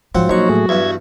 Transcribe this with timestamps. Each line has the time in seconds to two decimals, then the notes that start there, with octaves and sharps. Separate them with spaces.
0.15 G#2 F3 F#3 C4 F4 F#5
0.29 A#1 F#3 D#4 F#4 C5 C#5 C#6
0.49 A2 A3 G#4
0.69 E2 G2 E5 G#6